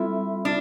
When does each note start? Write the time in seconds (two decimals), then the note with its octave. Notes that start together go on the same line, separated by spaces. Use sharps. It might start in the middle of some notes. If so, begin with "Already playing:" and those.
Already playing: G3 C4 E4 F4 A4 E5
0.45 D4 F4